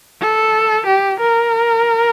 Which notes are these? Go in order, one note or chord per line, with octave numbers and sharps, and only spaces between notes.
A4
G4
A#4